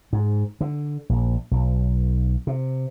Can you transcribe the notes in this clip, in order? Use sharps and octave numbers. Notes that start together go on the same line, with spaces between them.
G#2
D3
A#1
B1
C3